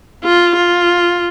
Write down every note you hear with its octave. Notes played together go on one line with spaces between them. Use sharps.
F4
F4